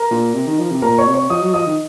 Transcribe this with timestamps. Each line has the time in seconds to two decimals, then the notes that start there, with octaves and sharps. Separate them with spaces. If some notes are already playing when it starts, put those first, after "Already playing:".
Already playing: A#4 A#5
0.11 A#2
0.34 C3
0.47 D#3
0.59 F3
0.70 C3
0.82 A#2 A#4 A#5
0.98 C#5 C#6
1.07 C3
1.14 C#5 C#6
1.30 F3 D#5 D#6
1.42 F#3
1.54 F3 D#5 D#6
1.66 D#3